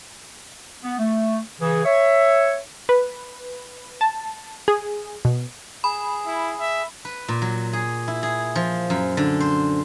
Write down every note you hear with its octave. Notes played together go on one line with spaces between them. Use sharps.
B3
A3
C#3 E3 G#4
C#5 E5
B4
A5
G#4
B2
G#4 B5
E4
E5
B4
A#2
F#3
G#4
E4
G#4
F3
F#2
D3
C5